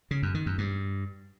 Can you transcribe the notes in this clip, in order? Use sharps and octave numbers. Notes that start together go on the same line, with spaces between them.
C#3
F#2
D#3
F#2
G2